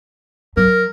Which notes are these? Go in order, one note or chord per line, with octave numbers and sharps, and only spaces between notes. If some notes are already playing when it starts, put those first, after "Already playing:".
F#3 A#4